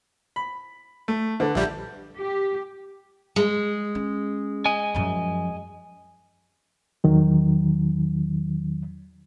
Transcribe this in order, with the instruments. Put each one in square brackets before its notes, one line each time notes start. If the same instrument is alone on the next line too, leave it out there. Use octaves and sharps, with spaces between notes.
[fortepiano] B5
A3
[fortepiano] D3 [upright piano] A4 B4
[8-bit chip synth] A#1 G3 [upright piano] E5 G6
[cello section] G4
[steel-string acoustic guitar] G#3
[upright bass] C#4
[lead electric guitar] D#5 G#5
[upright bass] F#2 F3
[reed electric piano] E2 D#3 F#3